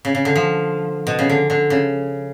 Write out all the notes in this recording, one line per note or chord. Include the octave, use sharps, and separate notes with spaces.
C#3
C#3
D3
F3
B2
C#3
D3
D3
C#3